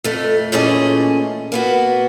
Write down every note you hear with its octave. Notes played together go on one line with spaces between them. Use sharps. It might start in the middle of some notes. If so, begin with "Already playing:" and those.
F2 A3
A#2 E3 A3 C#4 G#4 D#5
A#3 B3 F#4